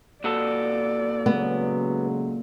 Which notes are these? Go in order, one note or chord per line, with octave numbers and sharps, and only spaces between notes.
A#2 F#4 A4 D5
C#3 F#3 G#3 B3